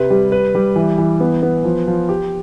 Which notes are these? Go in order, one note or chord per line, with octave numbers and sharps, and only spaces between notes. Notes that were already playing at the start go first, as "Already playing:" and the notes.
Already playing: C3 B4
G3
B4
G3
E3
E3
B3
B3
F3
F3
G4